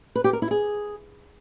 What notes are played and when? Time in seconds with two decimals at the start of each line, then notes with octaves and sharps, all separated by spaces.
0.15 B4
0.24 G4
0.33 A#4
0.42 E4
0.51 G#4